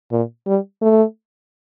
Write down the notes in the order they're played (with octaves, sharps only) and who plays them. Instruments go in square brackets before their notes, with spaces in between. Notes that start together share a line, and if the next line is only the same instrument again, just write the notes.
[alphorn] A#2
G3
A3